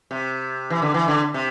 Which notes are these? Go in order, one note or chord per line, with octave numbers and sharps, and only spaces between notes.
C3
E3
D3
E3
D3
C3